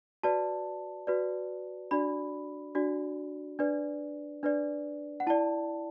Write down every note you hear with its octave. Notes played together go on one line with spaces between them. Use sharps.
F#4 B4 D5 A5
F#4 B4 D5
D4 F#4 D5 B5
D4 F#4 D5
D4 B4 D5
D4 B4 D5
F#5
E4 D5 A5